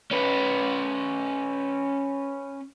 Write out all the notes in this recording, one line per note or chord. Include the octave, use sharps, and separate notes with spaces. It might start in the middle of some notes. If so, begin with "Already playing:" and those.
C#4 B4